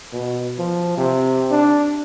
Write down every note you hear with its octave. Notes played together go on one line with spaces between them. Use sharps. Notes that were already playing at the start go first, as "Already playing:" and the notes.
B2
F3
C3
D4